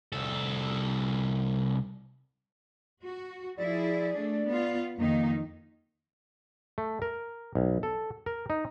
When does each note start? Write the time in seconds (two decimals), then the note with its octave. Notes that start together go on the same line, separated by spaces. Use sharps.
0.13 C2 A4
3.04 F#4
3.57 F3 E4 G#4 D5
4.15 A3 D4
4.48 B3 F4
4.98 F2 D#3 A#3 D#4
6.78 A3
7.02 A#4
7.55 B1
7.83 A4
8.26 A#4
8.50 D#4